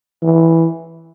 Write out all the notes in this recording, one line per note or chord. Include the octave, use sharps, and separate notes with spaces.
E3